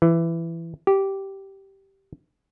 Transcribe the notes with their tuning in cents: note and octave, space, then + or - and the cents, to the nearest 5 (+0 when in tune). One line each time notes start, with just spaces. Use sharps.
E3 +15
G4 -10